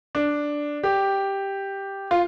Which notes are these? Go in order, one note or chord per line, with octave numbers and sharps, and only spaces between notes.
D4
G4
F4